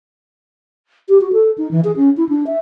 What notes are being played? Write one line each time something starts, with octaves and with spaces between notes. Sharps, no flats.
G4
F#4
A4
D#4
E3
G#4
C#4
E4
D4
E5